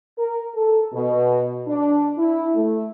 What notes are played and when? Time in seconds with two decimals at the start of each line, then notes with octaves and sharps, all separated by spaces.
0.18 A#4
0.55 A4
0.93 B2
1.68 D4
2.18 E4
2.55 A3